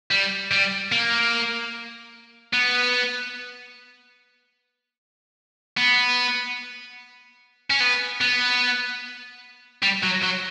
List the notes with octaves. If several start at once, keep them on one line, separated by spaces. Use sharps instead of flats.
G3
G3
A#3
B3
B3
C#4
B3
B3
G3
F#3
F#3